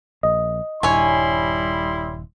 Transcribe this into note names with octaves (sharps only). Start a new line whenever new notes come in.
A#1 D#5
D#1 G2 G3 E4 C#5 G#5 C6